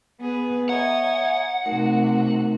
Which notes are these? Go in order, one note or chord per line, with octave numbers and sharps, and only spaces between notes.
B3 G#4 B4
C#5 D#5 E5 F#5 G#5 A#5
C3 A3 D#4 F#4 A#4